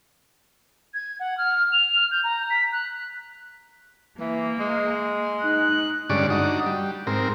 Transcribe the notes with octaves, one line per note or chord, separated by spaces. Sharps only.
G#6
F#5
F6
F7
F6
G6
A#5
B6
F#6
E3 A#3
G#3
D#4 F#6
G2 D3 G#3 C#4 D5
D4 D#4 F#4
G3
G#2 C4 A#4